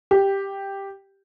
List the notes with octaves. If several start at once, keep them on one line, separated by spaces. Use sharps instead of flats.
G4